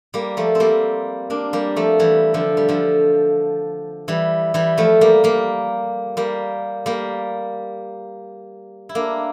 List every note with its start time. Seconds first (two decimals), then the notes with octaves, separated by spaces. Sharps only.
0.14 G3 A#3
0.37 F3 A3
0.55 C4
0.60 G3 A#3
1.30 A#3 D4
1.53 G3 A#3
1.76 F3 A3
2.00 E3 G3
2.34 D3 F3
2.57 G3
2.69 D3 F3
4.08 E3 G3
4.54 E3 G3
4.78 F3 A3
5.01 G3 A#3
5.24 G3 A#3
6.17 G3 A#3
6.86 G3 A#3
8.89 E4
8.95 A#3 D4